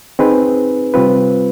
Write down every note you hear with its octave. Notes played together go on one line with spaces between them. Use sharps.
C4 D#4 G#4 B4
C3 G3 C4 F4 B4